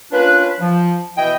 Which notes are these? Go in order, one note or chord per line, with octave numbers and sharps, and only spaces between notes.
A#3 C#4 D4 F4 B4
F3
B2 E3 E4 D#5 G5